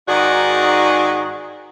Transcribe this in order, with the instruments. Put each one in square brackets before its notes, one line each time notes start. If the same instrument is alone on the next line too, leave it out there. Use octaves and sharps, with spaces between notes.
[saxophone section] G#2 D#3 D#4 F#4 G#4 D5